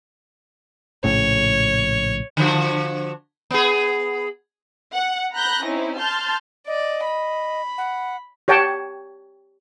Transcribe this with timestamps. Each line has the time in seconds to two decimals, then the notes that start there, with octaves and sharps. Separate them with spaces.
1.04 A#1 A2 C#3 C#5
2.37 D3 F3 F#4
3.51 B3 G#4
4.94 F#5
5.34 A#5 B5 F#6 G6 A#6
5.65 C4 C#4 D#4 E4
5.99 A5 C6 F6 G6 A6
6.68 D5 D#5
7.06 B5
7.78 F#5
8.48 G4 C#5 F#5 G5 A5